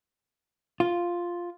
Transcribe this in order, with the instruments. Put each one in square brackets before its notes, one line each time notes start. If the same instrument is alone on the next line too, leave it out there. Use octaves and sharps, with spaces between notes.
[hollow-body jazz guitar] F4